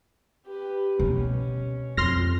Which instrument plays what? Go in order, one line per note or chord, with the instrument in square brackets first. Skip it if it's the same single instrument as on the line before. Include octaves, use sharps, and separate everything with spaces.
[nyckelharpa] G4 B4
[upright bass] B2 [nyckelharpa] C#4
[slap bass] F2 [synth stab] C6 F6 A#6